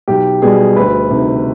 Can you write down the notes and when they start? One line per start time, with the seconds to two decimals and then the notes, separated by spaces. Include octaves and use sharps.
0.08 B1 G4
0.42 B2 G3 G#4
0.76 D2 B4
1.10 C3 D#3